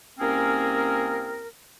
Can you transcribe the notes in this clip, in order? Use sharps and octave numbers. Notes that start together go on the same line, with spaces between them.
C2 A#3 C4 C#4 G#4 A#4